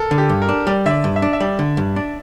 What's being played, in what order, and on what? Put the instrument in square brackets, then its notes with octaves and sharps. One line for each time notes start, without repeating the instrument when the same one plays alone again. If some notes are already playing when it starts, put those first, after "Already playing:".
Already playing: [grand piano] A4 A#4
[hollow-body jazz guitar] D3
[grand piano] G4
[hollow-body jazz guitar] G2
[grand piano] A#4
[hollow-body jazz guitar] D4
[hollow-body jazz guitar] G3 [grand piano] D5
[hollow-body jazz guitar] D3 [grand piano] E5
[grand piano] D5
[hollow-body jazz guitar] G2
[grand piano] E5
[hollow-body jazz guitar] D4
[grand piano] E5
[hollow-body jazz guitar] G3 [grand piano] D5
[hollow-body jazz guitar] D3
G2
D4